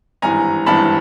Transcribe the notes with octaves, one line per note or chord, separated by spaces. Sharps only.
G#1 G2 E3 G#5 A#5
G#1 G2 E3 A5 B5